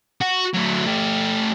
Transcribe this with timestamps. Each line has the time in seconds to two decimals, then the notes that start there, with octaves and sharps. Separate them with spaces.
0.21 F#4
0.54 F#3 A3
0.86 A3 G4